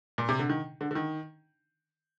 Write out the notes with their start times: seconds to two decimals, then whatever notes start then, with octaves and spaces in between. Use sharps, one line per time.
0.18 A#2
0.29 C3
0.39 D3
0.50 D#3
0.81 D3
0.91 D3
0.95 D#3